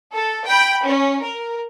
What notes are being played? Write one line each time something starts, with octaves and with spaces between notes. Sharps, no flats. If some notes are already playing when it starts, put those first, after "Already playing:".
A4
G5 B5
C#4
A#4